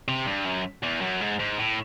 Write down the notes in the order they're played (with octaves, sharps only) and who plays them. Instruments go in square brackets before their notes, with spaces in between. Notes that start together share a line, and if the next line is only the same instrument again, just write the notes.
[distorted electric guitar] C3
G2
F#2
E2
F#2
G#2
G#2
A2